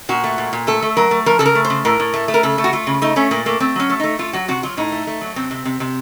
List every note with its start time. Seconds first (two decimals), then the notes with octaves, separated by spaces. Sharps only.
0.09 A#2 F#4
0.24 A3
0.38 A#2
0.53 A#2
0.67 A3 A4
0.82 A3
0.97 F#3 A#4
1.11 A3
1.26 F3 A#4
1.39 C#3 A4
1.46 A#4
1.55 A3
1.65 C5
1.70 C#3
1.85 A2 A#4
2.00 A2
2.14 A3
2.28 A3
2.34 A#4
2.43 C#3 A4
2.58 A3
2.64 F#4
2.73 A3 F4
2.87 C#3
3.02 A3 D#4
3.16 A3 C#4
3.31 A#2 A#3
3.46 A3 A#3
3.60 A3 C4
3.76 F#3 C#4
3.90 A3
4.00 A3 D#4
4.19 A3 F4
4.33 F#3 F#4
4.48 C3 F#4
4.63 F#3 F4
4.77 A2 D#4
4.92 A3
5.07 A3
5.21 F#3
5.36 C3 C4
5.51 C3
5.65 C3
5.80 C3